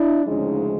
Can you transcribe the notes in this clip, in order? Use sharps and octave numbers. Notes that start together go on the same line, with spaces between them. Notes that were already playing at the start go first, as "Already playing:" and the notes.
Already playing: D4 E4
D2 C#3 F3 G#3 C#4 D#4